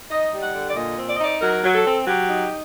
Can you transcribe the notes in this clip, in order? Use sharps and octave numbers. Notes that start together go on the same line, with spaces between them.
D#4 D#5
G3
F#5
D3
D5
A#2 D#5
C4
D5
D#5
D#4 D5
F#3 A#4
F#3
A4
C4
F#3 G4
D#4